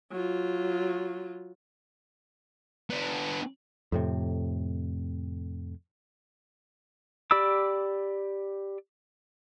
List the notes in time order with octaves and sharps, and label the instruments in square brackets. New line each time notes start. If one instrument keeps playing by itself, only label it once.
[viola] F#3 F4
[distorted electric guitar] B3 D4
[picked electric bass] F2 A2 C3
[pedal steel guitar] G4 D5 B5 D6 E6